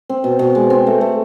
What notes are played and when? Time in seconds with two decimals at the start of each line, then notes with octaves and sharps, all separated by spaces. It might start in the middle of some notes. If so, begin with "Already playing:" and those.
0.09 C4
0.24 B2
0.39 B2
0.55 G#3
0.70 C4
0.87 A3
1.01 A3